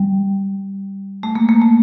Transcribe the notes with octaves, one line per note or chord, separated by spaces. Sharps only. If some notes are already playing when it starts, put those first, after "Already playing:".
Already playing: G3
A3
A#3
A#3
A3